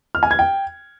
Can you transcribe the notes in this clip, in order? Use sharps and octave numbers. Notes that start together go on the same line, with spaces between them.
F6
G#5
G#6
G5